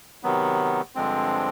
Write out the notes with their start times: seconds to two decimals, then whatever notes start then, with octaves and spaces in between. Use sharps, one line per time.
0.23 C3 D#3 F#3 B3
0.95 G2 D3 F3 G#3 C4